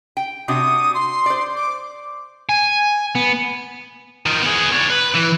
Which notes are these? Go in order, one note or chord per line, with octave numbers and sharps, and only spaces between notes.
G5
C3 D4 F#4 D#6
C6
C5 D5
D6
G#5
B3
D#3 F3
B3 G#4
D4 C#5
B4
E3